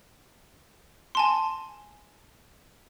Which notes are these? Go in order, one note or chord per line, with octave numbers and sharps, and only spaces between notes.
G#5 A5 C6